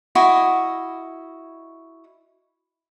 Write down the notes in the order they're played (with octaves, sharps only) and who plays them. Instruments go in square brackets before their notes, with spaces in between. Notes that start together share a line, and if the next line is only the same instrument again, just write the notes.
[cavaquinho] E4 F#4 D#5